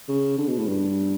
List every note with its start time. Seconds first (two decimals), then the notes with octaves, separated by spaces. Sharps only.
0.09 C#3
0.38 D3
0.48 B2
0.58 A2
0.67 G2